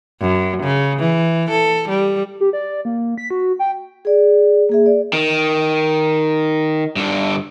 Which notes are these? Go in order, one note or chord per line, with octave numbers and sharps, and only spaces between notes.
F#2
C#3
E3
A4
G3
G4
D5
A#3
B6
F#4
G5
G#4 D5
A#3 G#4 E5
D5
D#3
G2 D3